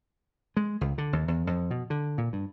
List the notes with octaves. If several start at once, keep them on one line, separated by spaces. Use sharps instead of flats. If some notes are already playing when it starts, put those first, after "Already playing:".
G#3
C#2
D3
D#2
E2
F2
B2
D3
A#2
G2